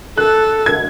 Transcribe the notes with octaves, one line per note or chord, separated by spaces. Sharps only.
A4 F#6
G#6